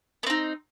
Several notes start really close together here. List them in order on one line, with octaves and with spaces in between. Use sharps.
B3 C4 D#4